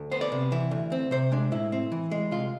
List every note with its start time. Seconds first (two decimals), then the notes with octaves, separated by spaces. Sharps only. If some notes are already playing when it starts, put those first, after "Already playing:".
Already playing: D2
0.11 B3 C5
0.21 D5
0.32 C3
0.52 E3
0.71 D2
0.92 C4
1.11 C3 C5
1.32 G#3 D4
1.52 A2 E4
1.72 C4
1.92 E3
2.11 G#3
2.31 C2 F4